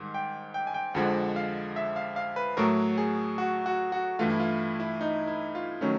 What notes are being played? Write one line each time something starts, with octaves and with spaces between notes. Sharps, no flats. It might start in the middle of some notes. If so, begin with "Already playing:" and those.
Already playing: G#2 D#3 G3
G5
G5
G#5
G5
F2 D3 F3 G#3 F#5
F5
E5
F5
F5
B4
A2 F#3 A3 A#4
G#4
F#4
F#4
F#4
G2 E3 A3 F4
E4
F4
E4
D#4
E4
F4
D#3 F#3 A3 C#4